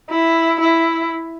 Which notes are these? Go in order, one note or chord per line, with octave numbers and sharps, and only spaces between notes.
E4
E4